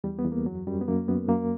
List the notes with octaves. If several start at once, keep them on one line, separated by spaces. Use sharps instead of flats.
E2 G3
B3
E2
A#3
F#2 F#3
F#2 G3
B3
F#2 A#3
F#2 B3
F#2 A#3